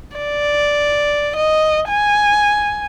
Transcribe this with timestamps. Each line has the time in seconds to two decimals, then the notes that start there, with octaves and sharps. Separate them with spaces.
0.17 D5
1.36 D#5
1.89 G#5